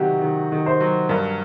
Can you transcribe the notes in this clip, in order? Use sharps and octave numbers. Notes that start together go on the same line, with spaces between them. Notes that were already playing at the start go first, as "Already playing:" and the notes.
Already playing: C3 D#3 F#3 F#4 G4
D#3
D#3
C5
F#3
G2 A#4